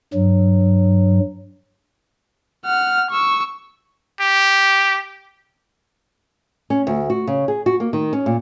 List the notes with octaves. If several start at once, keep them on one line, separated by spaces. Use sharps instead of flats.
G2 F#3
F#5 F6
C#6 E6
G4
C#4
D2
F#4
C#3
G#4
F#4
A#3
D#3
C#4
A#2